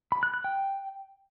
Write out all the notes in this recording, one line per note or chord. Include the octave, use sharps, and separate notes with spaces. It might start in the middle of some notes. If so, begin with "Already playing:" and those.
B5
F#6
F#6
G5